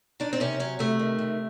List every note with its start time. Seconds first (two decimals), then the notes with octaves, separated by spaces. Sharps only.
0.20 D#3 D4
0.33 C4
0.40 C3 C#4
0.60 F#3 C#4
0.79 C3 A3
0.99 D#3
1.18 C3